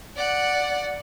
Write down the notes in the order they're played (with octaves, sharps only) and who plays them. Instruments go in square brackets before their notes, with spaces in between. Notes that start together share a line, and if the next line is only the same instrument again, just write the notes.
[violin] D5 F#5